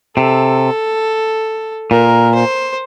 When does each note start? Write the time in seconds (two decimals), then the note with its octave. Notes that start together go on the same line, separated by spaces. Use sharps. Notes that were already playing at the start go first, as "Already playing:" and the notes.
0.17 C3 A4
1.91 A#2 A#4
2.35 C5